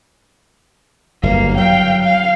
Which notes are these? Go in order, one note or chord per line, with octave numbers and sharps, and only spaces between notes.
G1 F#2 A#3 F5
F#3 F5 G5
F5